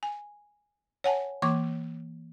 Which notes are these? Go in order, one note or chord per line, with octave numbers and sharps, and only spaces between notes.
G#5
C#5 F#5 G#5 A5
E3 A#3 C#6 D6